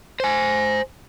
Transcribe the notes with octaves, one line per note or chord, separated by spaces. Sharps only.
C5 G#5